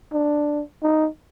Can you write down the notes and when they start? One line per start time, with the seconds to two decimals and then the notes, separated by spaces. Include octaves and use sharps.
0.13 D4
0.83 D#4